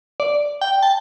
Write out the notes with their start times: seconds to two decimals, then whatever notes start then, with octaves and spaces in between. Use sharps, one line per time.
0.20 D5
0.61 G5
0.83 A5